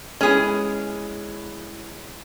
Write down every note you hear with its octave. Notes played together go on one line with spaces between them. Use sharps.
G#3 B3 C#4 E4 G#4